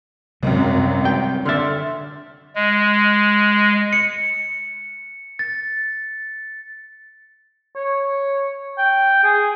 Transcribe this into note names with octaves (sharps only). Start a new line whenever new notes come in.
G#1 C#2 F#2 C3 F#3 G3
G5
D3 E5 C6 F6 A6
G#3
C#7
A6
C#5
G5
G#4